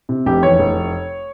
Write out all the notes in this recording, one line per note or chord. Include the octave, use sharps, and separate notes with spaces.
C3
F1 G4
E2 C#5
F1